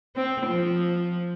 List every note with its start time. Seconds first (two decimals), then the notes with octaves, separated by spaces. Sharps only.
0.16 C4
0.47 F3